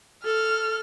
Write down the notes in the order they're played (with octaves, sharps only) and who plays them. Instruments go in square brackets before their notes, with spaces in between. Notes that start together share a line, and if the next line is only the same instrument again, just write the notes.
[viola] A4 [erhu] F6